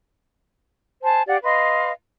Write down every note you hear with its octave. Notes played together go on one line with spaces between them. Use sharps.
C5 G#5 A5
G4 D5 F5 F#5
B4 D#5 F5 C6